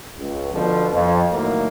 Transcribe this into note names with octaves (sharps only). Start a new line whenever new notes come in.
C#2
B2 D3 F3
F2
A2 D#3 F#3 A#3